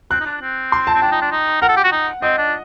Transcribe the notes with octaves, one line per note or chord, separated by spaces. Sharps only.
C4 F#6
D#4
D4
C4
C6
A5
C4
D4 G5
D#4
D4
D#4
A#4 F#5
A4
G4
F#4
D#4
C4 D#5
D4